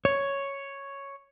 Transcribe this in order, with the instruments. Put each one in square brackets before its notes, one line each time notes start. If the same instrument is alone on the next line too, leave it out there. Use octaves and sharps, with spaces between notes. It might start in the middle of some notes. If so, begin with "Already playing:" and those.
[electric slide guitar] C#5